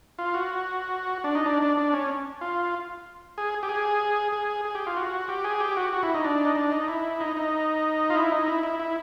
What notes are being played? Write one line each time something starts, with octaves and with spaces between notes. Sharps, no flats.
F4
F#4
D4
D#4
D4
D4
D4
C#4
F4
G#4
G4
G#4
G#4
G#4
G4
F4
F#4
G4
G#4
G4
F#4
F#4
E4
D#4
D4
D#4
D4
D#4
E4
D#4
D#4
F4
E4
D#4
E4
E4
E4